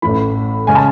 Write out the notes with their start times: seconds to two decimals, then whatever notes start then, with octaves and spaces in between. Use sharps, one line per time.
0.02 A1 A2 E3 B5
0.67 C#3 G#3 C#4 G#5
0.75 A5